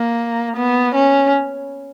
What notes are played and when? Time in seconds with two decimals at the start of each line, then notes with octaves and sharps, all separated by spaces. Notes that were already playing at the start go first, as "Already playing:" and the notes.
Already playing: A#3
0.57 B3
0.95 C#4